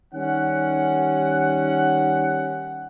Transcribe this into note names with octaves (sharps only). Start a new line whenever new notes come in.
D#3 G3 C#4 F#5